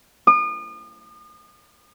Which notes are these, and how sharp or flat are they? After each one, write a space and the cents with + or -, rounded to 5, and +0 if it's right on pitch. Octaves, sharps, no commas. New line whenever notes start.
D#6 -40